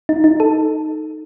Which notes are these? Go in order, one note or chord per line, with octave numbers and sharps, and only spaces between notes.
D#4
D#4
A4